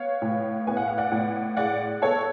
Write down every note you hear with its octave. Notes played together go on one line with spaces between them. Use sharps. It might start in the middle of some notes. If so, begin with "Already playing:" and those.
Already playing: B3 C#5 F5
A2
B3 G#5
F#5
F5
D5 F#5
A2
G#3 D5 F#5
B3 A4 C#5